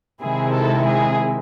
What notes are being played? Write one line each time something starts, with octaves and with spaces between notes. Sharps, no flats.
C3 D#3 G#3 C4 E4 G#4
A4
G#4